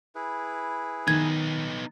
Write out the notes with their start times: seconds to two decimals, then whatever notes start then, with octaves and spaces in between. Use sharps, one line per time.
0.15 E4 G#4 B4
1.08 D#3 B3 D#4 G#6